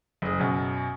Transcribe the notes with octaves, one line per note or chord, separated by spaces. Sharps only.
F#1 G#4
F#2 B2